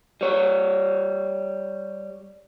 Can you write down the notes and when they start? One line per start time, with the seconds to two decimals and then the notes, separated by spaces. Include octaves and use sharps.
0.21 G3 C#5